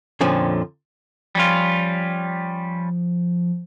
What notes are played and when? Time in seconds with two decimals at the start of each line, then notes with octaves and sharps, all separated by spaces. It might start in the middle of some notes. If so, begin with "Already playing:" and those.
0.21 F2 A#2 D3 F3 C4 C#4
1.35 F3 G3 C#4 F4